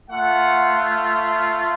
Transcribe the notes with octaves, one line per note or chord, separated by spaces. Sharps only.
A3 F4 F#5